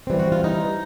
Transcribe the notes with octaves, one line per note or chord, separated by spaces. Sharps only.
E3 G3 C4
F#4
F4
D#4